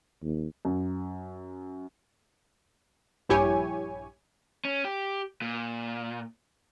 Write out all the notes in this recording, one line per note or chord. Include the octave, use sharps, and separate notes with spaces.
D#2
F#2
A#1 G2 E4 G4 C#5 G#5
C#4
G4
A#2